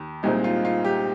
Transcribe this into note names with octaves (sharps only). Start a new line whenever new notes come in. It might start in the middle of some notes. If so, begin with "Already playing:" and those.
Already playing: D#2
C2 A#2 G#3 C4 D#4
F4
F4
G4